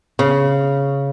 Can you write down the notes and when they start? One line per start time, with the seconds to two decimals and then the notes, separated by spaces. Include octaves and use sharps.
0.19 C#3